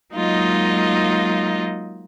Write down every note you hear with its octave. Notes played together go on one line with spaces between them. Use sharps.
F#3 G#3 A#3 D#4 F4 D#5